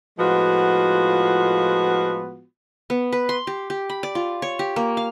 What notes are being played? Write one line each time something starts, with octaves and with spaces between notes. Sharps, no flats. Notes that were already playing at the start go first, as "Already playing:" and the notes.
A2 F3 G#3 B3 F4 F#4
B3
B4
C6
G4
G4
B5
D5
F4
C#5
G4
A#3
F5